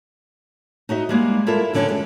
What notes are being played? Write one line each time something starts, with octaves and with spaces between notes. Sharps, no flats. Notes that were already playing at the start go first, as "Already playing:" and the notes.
D#4 F#4 D#5 E5
G3 G#3 A#3
E4 F4 A4 A#4 E5
F2 D3 C#4
G#3 G4